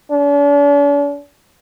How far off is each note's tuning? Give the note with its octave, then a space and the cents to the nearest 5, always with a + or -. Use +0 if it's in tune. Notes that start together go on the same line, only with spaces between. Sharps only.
D4 -45